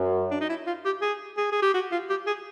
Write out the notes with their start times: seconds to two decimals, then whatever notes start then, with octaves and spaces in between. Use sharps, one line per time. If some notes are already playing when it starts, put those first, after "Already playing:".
Already playing: F#2
0.31 D4
0.41 D#4
0.49 E4
0.67 F4
0.85 G4
1.02 G#4
1.37 G#4
1.52 G#4
1.62 G4
1.74 F#4
1.92 F4
2.10 G4
2.27 G#4